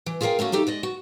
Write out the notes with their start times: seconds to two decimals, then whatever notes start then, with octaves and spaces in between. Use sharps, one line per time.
0.06 E3
0.21 F4 G#4 A#4 C#5 F5 G5
0.39 A3 A#3 C#4 F#4
0.52 A3 D#4 G4 A4
0.67 G#3 D5 D#5
0.83 F#4